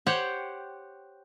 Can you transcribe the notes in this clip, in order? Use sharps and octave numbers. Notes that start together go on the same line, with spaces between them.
G4 C5 C#5 F#5 G5